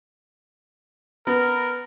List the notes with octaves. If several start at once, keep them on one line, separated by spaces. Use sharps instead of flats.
B3 A#4